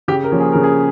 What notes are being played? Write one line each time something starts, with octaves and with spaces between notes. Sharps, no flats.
C#3 G4
A#4
F3 A#3 C#4
G#4
C#3 A#4
G#4